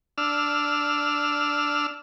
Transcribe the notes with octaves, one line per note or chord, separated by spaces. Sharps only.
D4 E6 F6